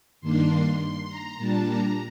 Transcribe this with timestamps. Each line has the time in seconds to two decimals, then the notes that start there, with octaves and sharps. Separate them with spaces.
0.21 G2 D#3 A#3 D4 C6
0.79 C6
1.08 A#5
1.37 A#2 G3 D4 A5
1.68 A#5